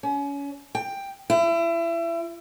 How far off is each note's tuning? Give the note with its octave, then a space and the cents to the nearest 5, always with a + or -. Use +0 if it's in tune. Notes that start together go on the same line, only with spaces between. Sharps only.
C#4 +30
G5 +10
E4 +30